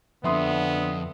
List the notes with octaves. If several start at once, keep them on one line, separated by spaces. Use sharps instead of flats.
F2 D3 B3 E5 C6 D#6